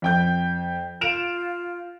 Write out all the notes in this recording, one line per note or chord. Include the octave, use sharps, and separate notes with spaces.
F2 G5 G6
F4 D7 E7 F7